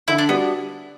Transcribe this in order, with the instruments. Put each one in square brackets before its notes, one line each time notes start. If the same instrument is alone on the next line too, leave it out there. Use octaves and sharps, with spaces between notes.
[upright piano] D3 [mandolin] E4
[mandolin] D4
[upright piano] G3 D4 F#4 [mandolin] B3